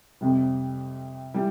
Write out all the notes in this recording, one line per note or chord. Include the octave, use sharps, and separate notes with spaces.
F2 C3 G3
E3 G3